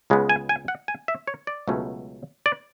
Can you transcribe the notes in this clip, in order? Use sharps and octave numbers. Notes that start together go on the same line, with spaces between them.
C#2 C#3 G#3 B3
G#5
G#5
F#5
G#5
E5
C#5
D5
C#2 B2 F#3 A3 C#4
D5